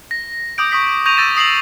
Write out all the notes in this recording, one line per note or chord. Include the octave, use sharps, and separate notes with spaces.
A#6
D6 D#6 G6 D7
C#6 D#6 B6
C#6 G6 A#6 D#7 F7
E6 A6 A#6 D#7 E7
D#6 C7 F7 F#7